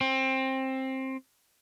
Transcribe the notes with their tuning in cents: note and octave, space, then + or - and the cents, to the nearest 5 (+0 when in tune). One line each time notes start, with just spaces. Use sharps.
C4 +15